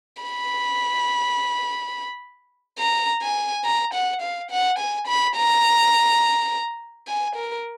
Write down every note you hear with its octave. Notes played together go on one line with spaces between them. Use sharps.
B5
A#5
G#5
A#5
F#5
F5
F#5
G#5
B5
A#5
G#5
A#4